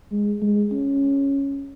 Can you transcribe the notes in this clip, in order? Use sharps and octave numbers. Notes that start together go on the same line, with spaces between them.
G#3
G#3
C#4